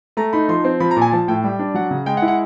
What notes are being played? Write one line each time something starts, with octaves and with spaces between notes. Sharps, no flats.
A3 A#5
D#4 B5
F3 C6
C4
F3 B5
A#5
A#2
G#5
F3 A5
A2 G5
G3
D4
F#3 F#5
C#3
G#3 G5
F#5
E4
F#5